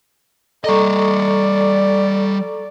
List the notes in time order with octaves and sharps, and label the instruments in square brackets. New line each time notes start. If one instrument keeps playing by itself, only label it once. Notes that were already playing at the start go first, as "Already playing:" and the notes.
[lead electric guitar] G3 D#5 [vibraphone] A4 A#5 C#6 [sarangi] D5